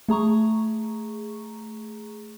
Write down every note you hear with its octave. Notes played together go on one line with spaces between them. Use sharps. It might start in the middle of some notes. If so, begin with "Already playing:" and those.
A3 G#4 A#5 C#6